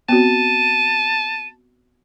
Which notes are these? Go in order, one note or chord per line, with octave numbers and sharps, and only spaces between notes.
B3 C4 F#4 A5 D#7